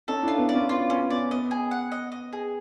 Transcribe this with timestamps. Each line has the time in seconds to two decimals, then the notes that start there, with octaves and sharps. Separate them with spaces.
0.08 C#4 D#4 A4
0.23 D4 E4 F4
0.38 B3
0.49 D5
0.54 B3 C#4
0.69 B3 F4
0.90 B3 C#4
1.10 B3 D5
1.31 B3 D#5
1.51 G#4
1.71 F#5
1.92 D#5
2.12 D#5
2.33 G#4